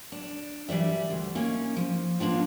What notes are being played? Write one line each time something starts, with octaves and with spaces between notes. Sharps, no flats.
D4
E3 G3 D5 E5
D2
A#3 C#4 D#4
F3
A#3 B3 D4 F4